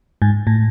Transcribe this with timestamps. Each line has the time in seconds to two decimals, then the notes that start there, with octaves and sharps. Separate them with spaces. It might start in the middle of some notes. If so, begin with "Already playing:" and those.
0.22 G#2
0.47 A2